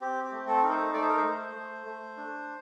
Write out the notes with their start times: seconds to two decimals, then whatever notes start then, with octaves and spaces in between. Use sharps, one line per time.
0.01 C4 G4
0.24 G4
0.32 A3
0.47 A4
0.62 D#4 A#4
0.70 C5
0.94 A3 D5
1.01 C5
1.09 A#4
1.17 C5
1.24 A3
1.55 A3
1.86 A3
2.17 D4